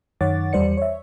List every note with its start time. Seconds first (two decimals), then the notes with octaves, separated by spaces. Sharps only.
0.21 F#2 D#3 C#5 F#5 D6 A6
0.53 E2 G3 C5 D5 C#7
0.77 C#5 E5